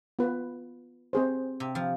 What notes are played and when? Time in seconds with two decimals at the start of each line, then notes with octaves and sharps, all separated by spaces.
0.19 B3 F4 B4
1.13 C4 G#4 C5
1.60 C3
1.75 F3